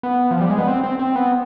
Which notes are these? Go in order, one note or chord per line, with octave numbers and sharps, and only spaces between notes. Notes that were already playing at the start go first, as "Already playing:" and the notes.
B3
F3
G3
G#3
B3
C4
C4
C4
B3